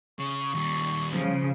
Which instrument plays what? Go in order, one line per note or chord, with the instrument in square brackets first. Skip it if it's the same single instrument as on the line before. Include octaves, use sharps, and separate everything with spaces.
[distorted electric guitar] C#3 [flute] C#6
[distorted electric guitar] D#2 G3
[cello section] C#3 F3